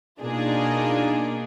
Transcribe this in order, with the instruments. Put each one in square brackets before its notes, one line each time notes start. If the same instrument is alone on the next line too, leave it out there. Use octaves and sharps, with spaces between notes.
[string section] B2 A#3 D4 D#4 F4 G#4